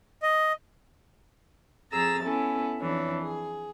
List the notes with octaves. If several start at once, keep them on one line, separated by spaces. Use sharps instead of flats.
D#5
F2 G#4 A#5 E6 A6
B3 C#4 E4 A4
F2 E3 D4 C#5
G#4